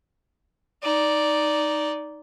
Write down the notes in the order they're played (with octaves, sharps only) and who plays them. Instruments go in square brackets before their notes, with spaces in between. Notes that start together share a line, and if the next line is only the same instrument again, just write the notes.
[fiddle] D#4 D5